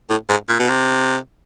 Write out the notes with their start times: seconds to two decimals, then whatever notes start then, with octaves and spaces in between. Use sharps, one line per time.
0.10 A2
0.29 G#2
0.49 A#2
0.59 B2
0.69 C3